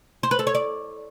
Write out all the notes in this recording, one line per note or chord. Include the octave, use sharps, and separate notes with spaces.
C5
B4
A4
C#5
D5